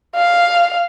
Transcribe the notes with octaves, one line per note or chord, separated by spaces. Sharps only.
F5